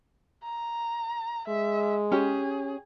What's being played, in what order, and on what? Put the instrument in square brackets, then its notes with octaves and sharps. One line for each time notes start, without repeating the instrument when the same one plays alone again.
[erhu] A#5
[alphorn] G#3 [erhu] E5
[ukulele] C#4 G4 [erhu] G#4